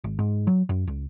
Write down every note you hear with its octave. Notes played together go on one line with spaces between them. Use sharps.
G#1
G#2
F#3
F#2
C#2